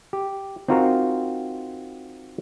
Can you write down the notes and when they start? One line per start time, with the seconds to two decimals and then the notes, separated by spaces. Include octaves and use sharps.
0.13 G4
0.68 C4 D#4 F4 F#4 A#4